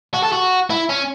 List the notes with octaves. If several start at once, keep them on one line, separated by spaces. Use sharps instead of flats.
F#4
A4
F#4
E4
C#4